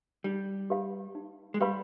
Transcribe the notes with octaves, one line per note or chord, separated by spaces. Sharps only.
G3 D#4
G4 B4 F5 B5
D#4
G#3
G3 G4 B4 F5 B5